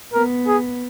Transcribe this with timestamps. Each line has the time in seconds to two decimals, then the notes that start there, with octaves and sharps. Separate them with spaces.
0.13 B3 A#4
0.47 G#4